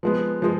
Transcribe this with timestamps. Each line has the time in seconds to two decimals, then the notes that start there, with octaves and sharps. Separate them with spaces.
0.03 F3 G#3 B3
0.42 F3 G#3